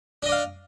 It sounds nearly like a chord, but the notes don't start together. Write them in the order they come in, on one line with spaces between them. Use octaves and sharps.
D4 D#5 D5 F5